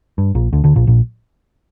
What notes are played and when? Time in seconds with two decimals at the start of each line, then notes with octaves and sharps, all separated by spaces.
0.18 G2
0.35 A#1 A#2
0.53 D2 D3
0.64 D2 D3
0.76 A#1 A#2
0.87 A#1 A#2